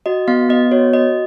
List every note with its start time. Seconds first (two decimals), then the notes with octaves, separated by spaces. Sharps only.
0.06 F#4 D#5
0.28 B3 F5
0.49 B3 D#5
0.71 F#4 C#5
0.93 F#4 D#5